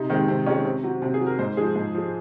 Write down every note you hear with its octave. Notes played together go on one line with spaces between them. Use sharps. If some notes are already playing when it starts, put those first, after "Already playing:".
Already playing: C3 D#4
D#3 G#3 C4
C3 C4
D#3 G#3 C#4
C3 C4
F#3 C4
C3 C4
G#4
F#3
A#4
G#2 C5
F3 G#3 G#4
G#2
F3 G#3